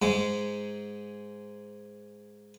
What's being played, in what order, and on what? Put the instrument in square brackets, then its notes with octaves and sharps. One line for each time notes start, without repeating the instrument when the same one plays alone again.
[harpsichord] G#2 G#3